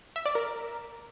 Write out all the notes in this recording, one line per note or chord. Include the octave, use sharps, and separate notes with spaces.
E5
D5
A#4